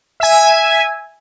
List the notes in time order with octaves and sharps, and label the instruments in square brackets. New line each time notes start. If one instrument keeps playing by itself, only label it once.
[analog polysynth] E5 G#5